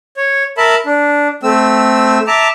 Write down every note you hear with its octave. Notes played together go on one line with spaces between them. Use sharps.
C#5
A#4 E5 A5 B5
D4
A3 C4 E6
E5 A5 A#5 D6